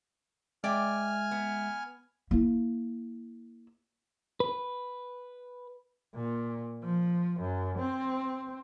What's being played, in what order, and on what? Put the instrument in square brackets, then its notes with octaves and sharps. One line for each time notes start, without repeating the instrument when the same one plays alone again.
[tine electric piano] G#3 E5 [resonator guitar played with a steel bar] D5 G5 [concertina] G#5 F6
[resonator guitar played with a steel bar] B3
[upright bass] A#3 E4
[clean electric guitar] B4
[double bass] A#2
F3
F#2
C4